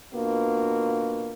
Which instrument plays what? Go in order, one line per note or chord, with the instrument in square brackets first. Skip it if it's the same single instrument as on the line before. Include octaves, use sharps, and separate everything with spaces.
[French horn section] B2 A#3 B3 D4 F4 F#4